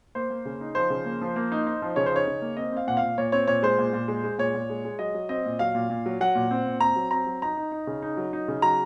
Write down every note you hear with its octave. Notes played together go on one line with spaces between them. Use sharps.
A#3 C5
A#3
C#3
D#4
F3 C5
C#3
A#3
F3
A#3
D#4
D#4
F3
C#3 C#5
C5
D#4 C#5
C#3
A#3
C4 D#5
C4 F5
A#2 F#5
F5
A#2
A#2 C#5
C4 C#5
A#2 C#5
G#3 C5
A#2
A#2
G#3
G#3
A#2 C#5
A#2
G#3
G#3
F#3 D#5
F#3
C4 D#5
A#2
F#3 F5
A#2
A#2
F#3
F#3 F#5
A#2
C4
A#2
C4 A#5
F#3
C4 A#5
F#3
D#4 A#5
D#4
D#4
C#3
D#4
F#3
D#4
C#3
F#3 A#5